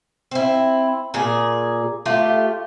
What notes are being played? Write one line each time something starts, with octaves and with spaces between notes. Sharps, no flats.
C4 E4
A#2 G#4
A3 F4 G4